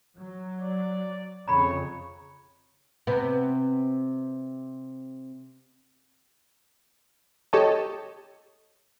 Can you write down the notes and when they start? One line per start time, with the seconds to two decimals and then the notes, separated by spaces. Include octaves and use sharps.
0.19 F#3
0.61 D5
1.48 F2 C#3 C#5 A#5 B5
3.07 C3 B3
7.53 G4 A4 C#5 D#5 A5